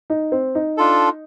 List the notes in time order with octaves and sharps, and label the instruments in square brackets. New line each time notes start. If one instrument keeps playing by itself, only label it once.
[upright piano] D#4
C4
D#4
[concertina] D4 F4 A4